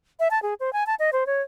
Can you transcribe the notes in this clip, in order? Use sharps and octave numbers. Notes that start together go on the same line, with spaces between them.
E5
A5
G#4
C5
G#5
A5
D#5
C5
C#5